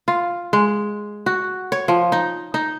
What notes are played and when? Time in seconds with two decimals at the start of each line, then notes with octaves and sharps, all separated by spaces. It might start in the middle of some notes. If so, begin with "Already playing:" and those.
0.08 F4
0.53 G#3
1.26 F#4
1.72 C#5
1.88 F3
2.12 D#4
2.54 D#4